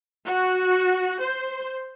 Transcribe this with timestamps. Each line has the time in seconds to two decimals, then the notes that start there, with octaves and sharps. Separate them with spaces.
0.25 F#4
1.20 C5